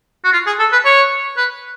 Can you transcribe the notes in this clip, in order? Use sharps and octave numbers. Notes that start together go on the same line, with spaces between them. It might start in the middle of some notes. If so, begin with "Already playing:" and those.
F#4
F4
G#4
A4
B4
C#5
B4